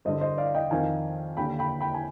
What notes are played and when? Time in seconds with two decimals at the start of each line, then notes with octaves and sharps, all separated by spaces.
0.05 G2 D3 C5 D#5
0.21 C5 D#5
0.37 D5 F5
0.55 D#5 G5
0.71 F2 D#3 F5 G#5
1.37 D#2 D3 G5 B5
1.59 G5 B5
1.80 G5 B5
1.94 G#5